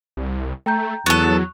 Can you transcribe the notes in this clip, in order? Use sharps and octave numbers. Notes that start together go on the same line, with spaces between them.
C2
A3 G5 A#5 G6
E2 F#3 B3 A4 C#6 F#6 F7